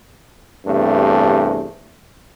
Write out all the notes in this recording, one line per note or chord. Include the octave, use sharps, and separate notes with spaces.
E2 G2 C3 A3